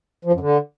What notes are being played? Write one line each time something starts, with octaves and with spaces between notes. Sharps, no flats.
F3
F#2
D3